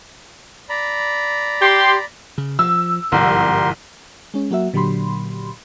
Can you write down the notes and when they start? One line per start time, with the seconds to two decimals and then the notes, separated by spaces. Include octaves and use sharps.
0.69 D5 A#5 B5
1.62 G4 C6
2.38 C#3
2.59 F3 E6
3.12 G1 C2 G#2 F3 G4 A#4 C6
4.34 G#3 C#4
4.51 F#3 A#3 F#4 E5
4.74 A#2 D3 F#3 G4 B5 C6